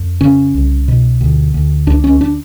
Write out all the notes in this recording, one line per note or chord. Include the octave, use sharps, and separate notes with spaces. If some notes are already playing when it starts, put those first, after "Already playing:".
Already playing: F2
C#3 C#4
C2
B2
D2
D2
C#2 D4
C#4
D4